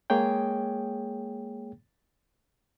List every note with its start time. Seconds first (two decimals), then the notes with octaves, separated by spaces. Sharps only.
0.10 G#3 A#3 G#4 C#5 G5